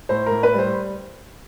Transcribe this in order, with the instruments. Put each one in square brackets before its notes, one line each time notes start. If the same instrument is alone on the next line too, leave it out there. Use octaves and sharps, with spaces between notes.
[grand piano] A2 C5
A2 A#4
B4
G3 C5